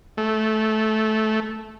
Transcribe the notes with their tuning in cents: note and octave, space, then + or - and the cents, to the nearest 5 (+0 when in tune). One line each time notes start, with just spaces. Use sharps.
A3 -15